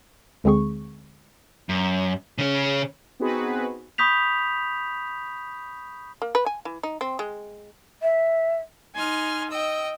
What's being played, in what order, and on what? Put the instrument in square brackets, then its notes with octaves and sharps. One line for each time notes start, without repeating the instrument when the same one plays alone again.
[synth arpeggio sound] D2 D3 G#3 C4 G#4 C#6
[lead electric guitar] F#2
C#3 C#4
[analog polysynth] B3 C4 D#4 F#4 G#4 B4
[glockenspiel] B5 C#6 D#6 G6 B6 F7
[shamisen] A#3
B4
G#5
E3
D#4
C4
G#3
[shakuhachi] E5
[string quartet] D#4 G#5 C6 F6
D#5 G5 E6